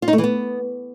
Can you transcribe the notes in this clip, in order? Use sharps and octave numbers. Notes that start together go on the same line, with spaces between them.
F4
D#4
A3
E3
B3